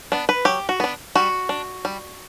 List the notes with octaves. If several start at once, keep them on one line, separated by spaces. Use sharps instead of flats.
B3 D4
B4
F#3 G4
F#4
B3 D4
G3 F#4
D4
G3